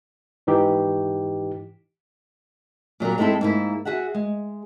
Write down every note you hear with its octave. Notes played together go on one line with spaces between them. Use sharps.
G#2 E3 D#4 G4
A#2 F#3 G3 A#4
G#3 A3 C4 E4 A4
G#2 A#3 E4
F#4 G#4 E5 F#5
G#3